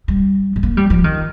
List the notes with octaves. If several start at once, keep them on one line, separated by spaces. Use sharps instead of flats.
G3
G3
A#3
G3
F3
D#3